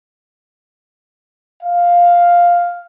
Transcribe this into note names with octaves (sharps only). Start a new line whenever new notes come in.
F5